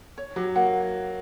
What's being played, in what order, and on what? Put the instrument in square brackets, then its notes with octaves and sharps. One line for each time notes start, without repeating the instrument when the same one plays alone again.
[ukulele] C#5
[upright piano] F#3 [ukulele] G4
[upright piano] A#3 [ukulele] F#5